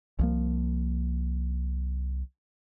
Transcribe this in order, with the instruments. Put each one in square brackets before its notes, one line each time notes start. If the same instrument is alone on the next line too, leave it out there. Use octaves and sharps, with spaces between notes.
[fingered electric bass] C2 F3 A#3